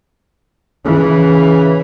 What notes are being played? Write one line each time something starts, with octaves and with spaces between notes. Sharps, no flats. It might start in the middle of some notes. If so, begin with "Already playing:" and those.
C#3 E3